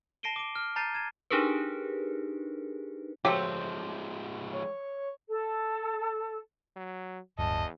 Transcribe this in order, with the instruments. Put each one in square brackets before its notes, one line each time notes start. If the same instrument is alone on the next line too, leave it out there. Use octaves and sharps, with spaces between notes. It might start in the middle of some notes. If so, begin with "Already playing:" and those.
[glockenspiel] A5 A#6 C7 D7 D#7 G7
D6 D7
F6
A5 A#5 G6 A6 C7 D#7
G#6 D#7 E7
[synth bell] D4 D#4 G4 G#4 A#4 B4
[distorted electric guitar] F3 G#3 [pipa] F#3 A3 C4 [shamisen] G4
[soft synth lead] C#5
[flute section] A4
[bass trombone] F#3
[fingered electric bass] D1 G2 [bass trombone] E2 [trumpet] D#5 [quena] A5